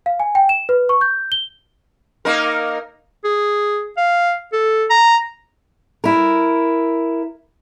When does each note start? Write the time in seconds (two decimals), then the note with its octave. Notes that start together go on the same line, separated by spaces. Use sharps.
0.06 F5
0.20 G#5
0.35 G5
0.49 E7
0.69 B4
0.89 C#6
1.01 G6
1.32 G7
2.25 A#3 D#4 A#4
3.25 G#4
3.97 F5
4.53 A4
4.90 A#5
6.04 E4 A#4